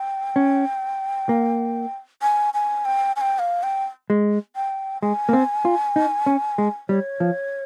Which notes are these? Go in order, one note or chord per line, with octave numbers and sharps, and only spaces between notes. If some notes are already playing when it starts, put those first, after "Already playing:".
Already playing: G5
C#4
A#3
G#5
G#5
G5
G#5
G5
F5
G5
G#3
G5
G#3 G#5
A#3
C4
F4
D#4
C#4
G#3
G3 C#5
F3